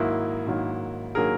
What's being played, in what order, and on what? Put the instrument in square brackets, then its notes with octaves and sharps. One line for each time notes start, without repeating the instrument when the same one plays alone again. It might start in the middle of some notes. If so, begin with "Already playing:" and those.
Already playing: [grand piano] G#2 D#3 F#3 A#3 E4
G#2 D#3 F#3 A#3
D#3 F#3 A#3 G#4 A#4